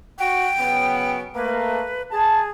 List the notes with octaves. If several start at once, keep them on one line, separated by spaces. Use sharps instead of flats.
F#4 G5
C#3 F#3 B3
A3 A#3 B4
G#4 A5